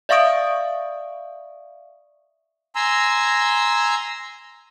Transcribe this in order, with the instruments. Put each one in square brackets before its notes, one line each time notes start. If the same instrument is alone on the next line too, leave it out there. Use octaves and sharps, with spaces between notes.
[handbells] D5 E5 F5 C#6 D#6 D7
[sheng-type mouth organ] G#5 A#5 C6 E6